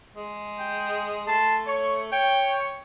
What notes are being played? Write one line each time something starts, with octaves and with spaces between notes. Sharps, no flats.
G#3
G5
A3 A5 C6
C#5 C#6
C#5 G5 C#6